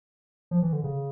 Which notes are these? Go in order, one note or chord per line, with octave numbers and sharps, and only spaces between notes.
F3
E3
D3
C#3